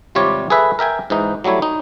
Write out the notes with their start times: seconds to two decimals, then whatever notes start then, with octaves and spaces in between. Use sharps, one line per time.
0.15 G#1 C3 G3 F4 C#5 D5
0.50 G#4 A4 B4 E5
0.79 A#4 E5 G5 G#5
1.10 G#2 E3 D#4
1.44 F#3 G3 A3 E4 C#5
1.62 D#4